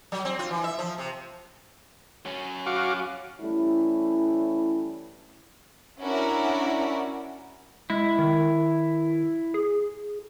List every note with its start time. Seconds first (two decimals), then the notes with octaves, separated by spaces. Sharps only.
0.12 F#3
0.25 C4
0.39 F4
0.51 E3
0.64 E5
0.79 F3
0.98 C3
2.26 F#3 C#4
2.66 F#4 F5 D6
3.39 E3 G3 A3 C#4 E4
6.00 C#4 D4 E4 F#4 A#4
7.90 G#3 E4
8.19 D#3
9.54 G#4